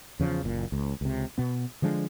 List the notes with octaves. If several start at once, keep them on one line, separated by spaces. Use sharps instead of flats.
E2 C#3 E3 F3
F#1 A#2
C#2
C#2 C3
B2 B3
D3 F3 G#3 D4